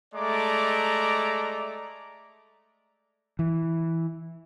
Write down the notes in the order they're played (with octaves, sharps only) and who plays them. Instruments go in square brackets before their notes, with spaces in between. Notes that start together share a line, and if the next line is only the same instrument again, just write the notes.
[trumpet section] G#3 A3 D5 A#5 D6
[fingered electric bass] E3